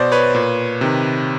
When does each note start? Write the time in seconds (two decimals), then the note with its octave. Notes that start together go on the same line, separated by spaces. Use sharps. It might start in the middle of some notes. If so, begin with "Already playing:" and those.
Already playing: B2 C5 D5
0.12 B4 C#5
0.35 A#2
0.81 C3 D#3